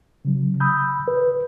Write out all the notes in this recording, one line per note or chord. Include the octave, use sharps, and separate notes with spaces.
C#3 F#3
B5 D#6 E6 G6
B4